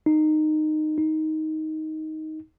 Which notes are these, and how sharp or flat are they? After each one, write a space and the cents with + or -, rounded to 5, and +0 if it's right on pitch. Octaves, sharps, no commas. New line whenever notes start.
D#4 -15
D#4 +10